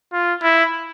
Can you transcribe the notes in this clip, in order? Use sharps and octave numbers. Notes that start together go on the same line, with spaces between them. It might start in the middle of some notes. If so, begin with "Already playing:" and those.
F4
E4